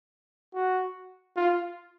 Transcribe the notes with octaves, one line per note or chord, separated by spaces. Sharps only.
F#4
F4